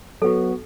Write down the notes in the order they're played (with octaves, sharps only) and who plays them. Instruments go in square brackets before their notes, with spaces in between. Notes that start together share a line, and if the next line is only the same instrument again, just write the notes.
[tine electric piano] F#3 B3 F#4 [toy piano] A4